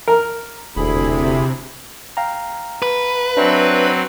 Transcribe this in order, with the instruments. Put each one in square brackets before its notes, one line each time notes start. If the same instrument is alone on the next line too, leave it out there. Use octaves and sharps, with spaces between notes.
[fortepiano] A#4
[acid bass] E1 [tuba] D2 [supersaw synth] C3 [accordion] E4 G#4 B5
[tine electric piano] F5 G5 A#5
[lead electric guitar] B4
[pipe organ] F#3 C4 [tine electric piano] D4 C#5 E5